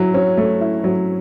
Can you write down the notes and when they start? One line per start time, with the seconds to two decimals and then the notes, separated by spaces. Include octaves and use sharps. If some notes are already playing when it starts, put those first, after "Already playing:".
Already playing: F#3 E4
0.14 C#4
0.37 A3
0.61 E4
0.84 F#3